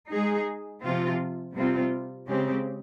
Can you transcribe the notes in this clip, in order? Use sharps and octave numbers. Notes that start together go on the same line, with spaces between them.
G#3 D#4 G#4
C3 F3 C4 F4
C3 G3 C4 F4
C#3 G#3 C4 G4